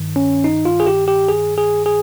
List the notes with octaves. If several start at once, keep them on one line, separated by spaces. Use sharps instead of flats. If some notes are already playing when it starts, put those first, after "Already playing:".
Already playing: G2 D#3
C#4
D#4
F4
G#4
G4
G4
G#4
G#4
G#4